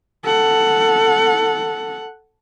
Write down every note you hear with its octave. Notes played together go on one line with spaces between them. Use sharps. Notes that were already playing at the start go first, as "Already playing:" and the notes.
A4 F#5